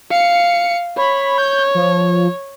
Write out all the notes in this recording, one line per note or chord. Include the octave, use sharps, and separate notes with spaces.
F5 C#7
C#5 B5
G6
F3